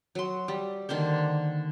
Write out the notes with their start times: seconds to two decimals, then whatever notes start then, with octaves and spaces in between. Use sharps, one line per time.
0.15 F#3 C6
0.48 G3
0.89 D3 D#3 A#3 C5